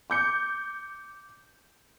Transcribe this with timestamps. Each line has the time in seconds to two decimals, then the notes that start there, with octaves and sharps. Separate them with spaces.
0.10 D6 G6 C#7